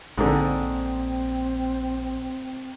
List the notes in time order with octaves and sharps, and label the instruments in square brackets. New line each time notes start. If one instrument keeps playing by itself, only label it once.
[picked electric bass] A#1 [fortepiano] G#2 D3 [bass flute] C4